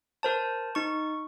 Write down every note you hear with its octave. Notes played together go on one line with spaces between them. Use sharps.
A#4 C5 A5
D#4 C#6